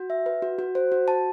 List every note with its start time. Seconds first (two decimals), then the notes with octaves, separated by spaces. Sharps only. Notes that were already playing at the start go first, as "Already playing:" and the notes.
Already playing: F#4
0.10 E5
0.26 B4
0.42 F#4
0.59 F#4
0.75 C5
0.92 F#4
1.08 A5